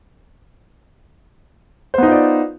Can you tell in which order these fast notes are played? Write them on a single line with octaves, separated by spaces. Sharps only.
C5 B3 D#4 F4 D5